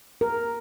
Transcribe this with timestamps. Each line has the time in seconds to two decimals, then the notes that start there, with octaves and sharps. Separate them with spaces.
0.21 A#4